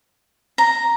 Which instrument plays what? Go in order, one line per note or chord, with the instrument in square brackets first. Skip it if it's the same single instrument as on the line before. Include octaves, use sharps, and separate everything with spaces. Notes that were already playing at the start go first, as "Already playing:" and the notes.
[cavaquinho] A#5